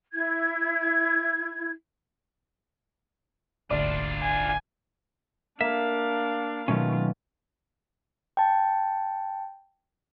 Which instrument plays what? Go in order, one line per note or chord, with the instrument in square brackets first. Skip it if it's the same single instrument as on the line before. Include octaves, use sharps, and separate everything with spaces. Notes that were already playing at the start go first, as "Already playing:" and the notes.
[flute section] E4 G#6
[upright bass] D#1 G#1 [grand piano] D2 D5 [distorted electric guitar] D4 F4
[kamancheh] G#5
[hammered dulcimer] A#3 [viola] D4 F5 [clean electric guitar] E5
[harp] B2 F#3 [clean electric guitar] D#3 A3 C#4 [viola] F4
[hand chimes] G5 A5